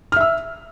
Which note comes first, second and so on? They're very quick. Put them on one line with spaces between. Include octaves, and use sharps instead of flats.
F6 E5 E6